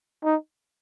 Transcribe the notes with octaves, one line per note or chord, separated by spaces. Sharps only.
D#4